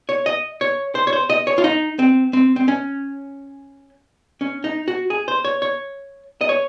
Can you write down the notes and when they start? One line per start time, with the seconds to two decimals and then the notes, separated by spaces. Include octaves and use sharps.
0.09 C#5
0.26 D#5
0.61 C#5
0.95 C5
1.07 C#5
1.13 C5
1.30 D#5
1.47 C#5
1.58 F4
1.64 D#4
1.99 C4
2.33 C4
2.56 C4
2.68 C#4
4.41 C#4
4.64 D#4
4.88 F#4
5.10 G#4
5.28 C5
5.45 C#5
5.62 C#5
6.41 D#5
6.49 C#5